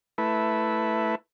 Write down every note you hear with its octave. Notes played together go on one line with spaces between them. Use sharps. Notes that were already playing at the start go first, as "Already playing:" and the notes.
A3 E4 B4